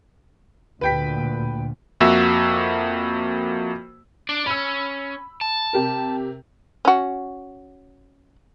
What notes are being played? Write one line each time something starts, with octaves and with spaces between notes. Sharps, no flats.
D2 A#2 B4 G5 B6
F2 A#3 F#4 E5 E6
D4 D5
C#4 B5 E6
A5
C3 G4 A#4
C#4 F#4